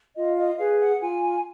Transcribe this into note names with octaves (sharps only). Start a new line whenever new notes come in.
F4 D#5
D#5
G#4 B4 F5
F#5
F4 G#5